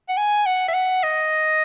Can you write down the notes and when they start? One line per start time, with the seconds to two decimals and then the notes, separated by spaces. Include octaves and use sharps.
0.09 F#5
0.17 G#5
0.46 F#5
0.68 E5
0.74 F#5
1.03 D#5